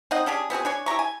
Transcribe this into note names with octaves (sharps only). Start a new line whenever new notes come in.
C4 D#4 D#5 F#5
C#4 D4 G4 G#4
B3 C4 F#4 G#4
D4 C#5 G#5
E4 G4 A#5 C#6
G#5